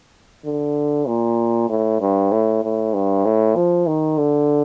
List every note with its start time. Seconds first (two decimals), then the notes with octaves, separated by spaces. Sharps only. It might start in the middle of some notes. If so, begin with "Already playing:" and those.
0.45 D3
1.08 A#2
1.69 A2
2.01 G2
2.32 A2
2.63 A2
2.94 G2
3.25 A2
3.56 F3
3.87 D#3
4.18 D3